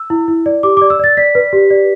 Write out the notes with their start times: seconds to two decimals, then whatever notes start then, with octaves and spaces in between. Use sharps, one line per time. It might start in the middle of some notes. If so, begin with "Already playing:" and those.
Already playing: E6
0.10 E4
0.28 E4
0.46 D5
0.63 G4 D6
0.77 D6
0.81 D5
0.90 E6
0.99 D5 A6
1.17 D5 B6
1.35 B4
1.53 G4
1.70 D5